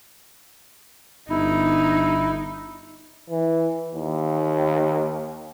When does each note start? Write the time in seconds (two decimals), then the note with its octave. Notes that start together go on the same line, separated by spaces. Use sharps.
1.30 G1 D#4 E4
3.30 E3
3.95 D#2